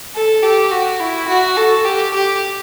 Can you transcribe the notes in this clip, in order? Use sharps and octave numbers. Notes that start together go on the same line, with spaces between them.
A4
G4
F#4
E4
F#4
A4
G4
G4